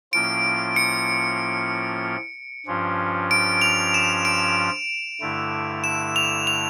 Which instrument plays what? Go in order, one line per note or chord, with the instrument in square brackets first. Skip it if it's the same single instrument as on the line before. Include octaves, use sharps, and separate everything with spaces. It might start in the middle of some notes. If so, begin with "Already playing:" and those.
[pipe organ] A2 F3 A#3 C#4 F4 [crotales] D7
[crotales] C#7
[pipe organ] G2 F3 C#4 F4
[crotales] D7
F7
E7
D7
[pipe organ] G2 D3 A3 E4
[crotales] E7
F7
F7